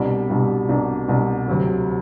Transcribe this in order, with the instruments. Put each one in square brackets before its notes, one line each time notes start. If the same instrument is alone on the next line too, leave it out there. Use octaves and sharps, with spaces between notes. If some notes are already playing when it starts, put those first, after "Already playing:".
Already playing: [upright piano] C2 B2 G3 D4
C2 B2 G3 D4
C2 B2 G3 D4
C2 B2 G3 D4
D2 C3 F#3